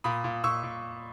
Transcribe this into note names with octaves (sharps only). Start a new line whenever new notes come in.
A#2 B5 D#6
A#2
A#2 C#6 E6
A#2